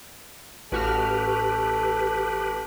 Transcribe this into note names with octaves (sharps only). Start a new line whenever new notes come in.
A1 F#4 G4 A4 B4 F6